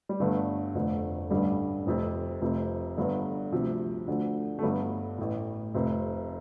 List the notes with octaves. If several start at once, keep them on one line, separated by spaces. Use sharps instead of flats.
G3
G1 G2 D3 A3
F1 F2 D3
A1 G2 D3 G3
F1 F2 C3
F1 F2 C3
G1 G2 D3
D2 C3 F3
D2 D3
A3
G1 G2 D3 G3
A1 A2
F1 F2 C3